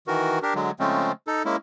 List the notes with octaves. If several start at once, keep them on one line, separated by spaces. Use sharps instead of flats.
D#3 E3 F#4 A#4
D4 G4 A#4
D3 F#3 G#3
C#3 F3 G#3 A3 C4 C#4
D#4 A4
G#3 A#3 C#4 E4